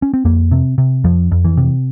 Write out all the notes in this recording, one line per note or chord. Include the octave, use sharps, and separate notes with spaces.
C#4
C4
F2 A#3
C3
C3
F2 F3
F2
E3
C3